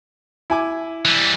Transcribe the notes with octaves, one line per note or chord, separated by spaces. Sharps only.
E4 G#5 D6
E3 G3